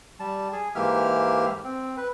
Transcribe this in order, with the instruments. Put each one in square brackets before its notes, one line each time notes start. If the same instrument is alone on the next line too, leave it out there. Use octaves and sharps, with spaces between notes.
[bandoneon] G3 A5
G#4
G#2 E3 A#3 G4 E5 F6
C4
B4